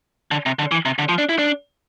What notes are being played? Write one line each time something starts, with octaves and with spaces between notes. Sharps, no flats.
D3
C3
D3
E3
C3
D3
F3
D4
E4
D4